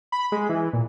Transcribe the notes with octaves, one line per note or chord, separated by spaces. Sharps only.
B5
G#3
E3
A#2